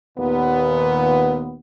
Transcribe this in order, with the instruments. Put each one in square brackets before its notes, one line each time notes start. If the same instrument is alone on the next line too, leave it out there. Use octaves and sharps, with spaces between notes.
[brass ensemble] D#2 A#2 B3